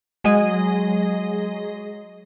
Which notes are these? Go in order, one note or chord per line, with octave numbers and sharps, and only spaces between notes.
F#3 G#3 G#4 D#5